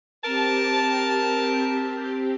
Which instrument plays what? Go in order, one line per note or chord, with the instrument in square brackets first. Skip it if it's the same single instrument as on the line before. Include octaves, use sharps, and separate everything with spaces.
[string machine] C4 G4 [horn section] A#4 A5